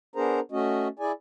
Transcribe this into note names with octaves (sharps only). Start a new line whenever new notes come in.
B3 D4 G#4 A#4 C5 A#5
A3 C#4 F#4 D#5
E4 G#4 D5 G#5